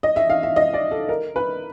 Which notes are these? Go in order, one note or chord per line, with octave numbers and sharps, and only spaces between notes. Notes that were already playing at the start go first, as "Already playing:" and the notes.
D#5
E5
F5
E5
D#5
D5
A4
A#4
B4